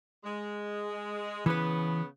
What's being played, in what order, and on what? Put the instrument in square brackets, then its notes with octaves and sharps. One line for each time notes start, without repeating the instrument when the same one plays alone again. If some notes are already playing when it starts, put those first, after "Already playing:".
[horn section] G#3
[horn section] C#3 B3 [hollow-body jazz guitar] E3 B4